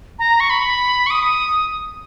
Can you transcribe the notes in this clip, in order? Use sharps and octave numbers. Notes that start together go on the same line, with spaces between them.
A#5
C#6
B5
C#6
D#6